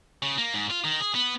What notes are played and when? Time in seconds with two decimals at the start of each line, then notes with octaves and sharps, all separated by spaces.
0.22 C#3
0.38 A#3
0.54 G#2
0.71 F4
0.84 D#3
1.01 G#4
1.15 B3